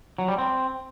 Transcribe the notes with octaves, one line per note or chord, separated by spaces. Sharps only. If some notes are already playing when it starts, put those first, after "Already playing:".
F#3
G3
C4